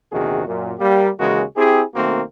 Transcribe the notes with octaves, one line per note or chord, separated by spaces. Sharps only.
A#1 E2 C3 D#3 F#4 G#4
F#2 A#2
G3 A#3 G4
D#2 C#3 E3 G#3 F#4 A#4
C4 E4 G4 G#4
B1 D#3 A3 A#3 C4 F#4